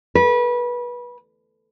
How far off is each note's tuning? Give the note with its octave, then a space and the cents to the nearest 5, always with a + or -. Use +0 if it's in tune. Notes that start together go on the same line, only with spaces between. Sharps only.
B4 -25